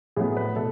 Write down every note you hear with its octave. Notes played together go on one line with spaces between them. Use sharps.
A2 F#3 B3 G#4
B4
B2 A3 A4